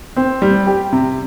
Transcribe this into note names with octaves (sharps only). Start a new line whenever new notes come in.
C4
G3
G4
C3